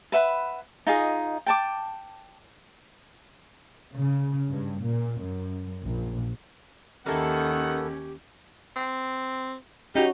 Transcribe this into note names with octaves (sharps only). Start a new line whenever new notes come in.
B4 E5 F#5 B5
D#4 F4 G#4 D#5
G5 A5 D6
C#3
G2
A#2
F#2
A#1
D#2 D#3 A#3 C#4 E4 G4 A4 F#5
C4
C#4 D#4 F#4 G4